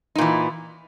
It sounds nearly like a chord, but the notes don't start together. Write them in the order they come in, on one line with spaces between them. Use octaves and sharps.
D#4 A#2 E3